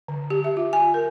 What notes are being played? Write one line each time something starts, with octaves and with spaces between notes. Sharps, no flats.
D3
G4
E5
F4
G#5
A#4